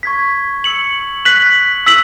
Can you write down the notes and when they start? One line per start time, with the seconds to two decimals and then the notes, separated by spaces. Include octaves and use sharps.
0.03 C#6 G#6 B6
0.64 E6 C#7 F#7
1.25 F#6 B6 F#7
1.86 E6 B6 F#7